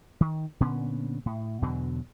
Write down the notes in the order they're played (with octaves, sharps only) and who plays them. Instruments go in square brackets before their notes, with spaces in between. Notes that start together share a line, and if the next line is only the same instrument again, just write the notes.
[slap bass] D#3
A#2 D3 B3 C#4
A2
E2 B2 D3 F#3